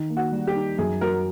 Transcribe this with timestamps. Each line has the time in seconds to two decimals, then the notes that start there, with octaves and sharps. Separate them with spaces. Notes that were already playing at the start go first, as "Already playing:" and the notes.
Already playing: D#3 D#4
0.10 A#3
0.17 F#4
0.32 G3
0.47 G4
0.55 D#4
0.78 F#2 G#4
1.01 F#3 A#4